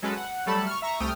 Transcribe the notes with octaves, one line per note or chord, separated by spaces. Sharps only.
F#3 G#3 C#4 A4 B4
F#5
F#3 G3 A3 A4 A5 B5
C#6 F6
E5 A#5 C#6
C2 A3 G5 D#6 F6